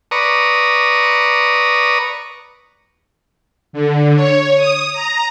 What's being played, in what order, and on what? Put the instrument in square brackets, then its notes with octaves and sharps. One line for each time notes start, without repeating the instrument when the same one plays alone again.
[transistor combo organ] B4 D5 A#5 C#6 D#6
[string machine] D3
C#5
D#6
A#5